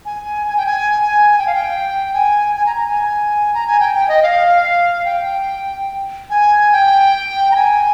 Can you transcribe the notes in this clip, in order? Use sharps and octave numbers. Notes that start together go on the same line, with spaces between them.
G#5
G#5
G5
G#5
G#5
G5
F5
G5
G#5
G#5
A#5
A#5
G#5
A#5
G#5
G5
G5
D#5
F5
G5
G#5
G5
A#5
G#5